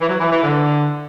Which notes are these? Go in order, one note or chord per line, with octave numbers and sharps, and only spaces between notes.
E3
F#3
E3
E3
D3